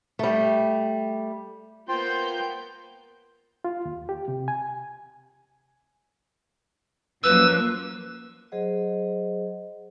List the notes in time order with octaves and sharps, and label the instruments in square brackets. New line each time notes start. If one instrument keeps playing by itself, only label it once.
[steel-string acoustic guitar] G3 A3
[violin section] A#3 B3 G6 [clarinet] F4 [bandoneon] C5 G5 C6
[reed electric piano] F4
D#2
G4
C3
G#5
[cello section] F#2 F3 A#3 [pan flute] B4 [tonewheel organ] E6
[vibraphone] F#3 G#4 C5 D#5 F#5